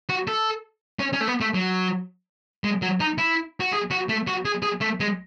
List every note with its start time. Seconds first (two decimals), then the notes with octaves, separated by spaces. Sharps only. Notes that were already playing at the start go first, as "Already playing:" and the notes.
0.09 F#4
0.27 A4
0.99 C#4
1.13 C#4
1.21 A3
1.28 B3
1.41 A3
1.55 F#3
2.64 G#3
2.82 F#3
3.00 D#4
3.18 E4
3.60 F#4
3.72 G#4
3.91 F#4
4.09 A3
4.27 F#4
4.45 G#4
4.63 G#4
4.81 A3
5.00 G#3